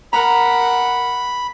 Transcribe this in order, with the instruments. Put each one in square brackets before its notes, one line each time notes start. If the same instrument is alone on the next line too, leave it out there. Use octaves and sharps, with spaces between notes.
[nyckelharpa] A#4 F#5 [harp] A#5 [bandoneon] B5